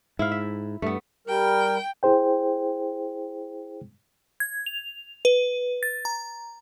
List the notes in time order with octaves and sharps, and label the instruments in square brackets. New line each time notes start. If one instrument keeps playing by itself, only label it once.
[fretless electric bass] G#2 [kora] E4 F5
[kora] E5
[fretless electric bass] G2 [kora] A3 B3
[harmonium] G3 A#4 [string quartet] G5
[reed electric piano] E4 G#4 C5 G5
[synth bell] G#6
F7
B4
A6
A#5